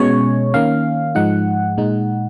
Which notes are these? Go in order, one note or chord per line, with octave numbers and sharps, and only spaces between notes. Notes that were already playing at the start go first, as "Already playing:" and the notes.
Already playing: B2 G#3 C#4 C#5
D#3 A#3 C#4 F5
G#2 F3 G#3 D#4 F#5
A#2 G#3 D#4